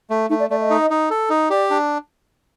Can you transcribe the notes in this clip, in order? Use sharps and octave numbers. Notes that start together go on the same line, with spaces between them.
A3
A3 D#4
D5
A3 D5
D#5
D#4
D#4
A4
D#4
G4 D5
D4